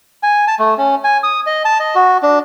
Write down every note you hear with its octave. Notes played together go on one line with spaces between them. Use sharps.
G#5
A5
A3
C#4
G#5
D#6
D#5
A5
D#5
F#4
D4